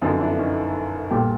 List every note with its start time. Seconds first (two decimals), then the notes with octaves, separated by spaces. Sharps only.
0.01 G1 F#2 D3 F3 D#4 F4
0.20 D4 E4
0.38 C#4 D#4
1.11 A#1 A#2 G3 G4 A4